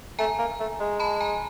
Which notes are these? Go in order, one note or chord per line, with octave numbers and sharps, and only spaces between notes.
A3 G#5 A#5
A#3
A3
G#3
A5 B5
G#5 A#5